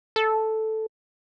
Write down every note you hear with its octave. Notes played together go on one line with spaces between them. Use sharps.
A4